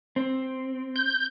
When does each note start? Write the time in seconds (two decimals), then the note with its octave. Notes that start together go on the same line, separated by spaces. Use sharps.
0.16 C4
0.96 G6